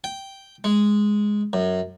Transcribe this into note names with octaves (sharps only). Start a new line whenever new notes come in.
G5
G#3
F#2